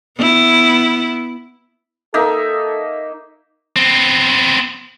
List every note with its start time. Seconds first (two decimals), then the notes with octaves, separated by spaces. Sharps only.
0.19 B3 E4
2.14 A#3 D#4 A4 E5
3.76 B3 C4